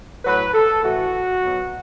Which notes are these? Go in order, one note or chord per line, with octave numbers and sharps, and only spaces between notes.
A2 F#3 B4
A4
A2 E3 F#4
B2 F#3